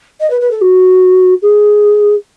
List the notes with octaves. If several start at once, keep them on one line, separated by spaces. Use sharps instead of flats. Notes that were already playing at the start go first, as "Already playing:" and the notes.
D#5
B4
B4
A4
F#4
G#4